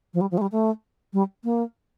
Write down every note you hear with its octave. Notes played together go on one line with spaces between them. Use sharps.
F3
G3
F3
A3
G3
A3
G3
A#3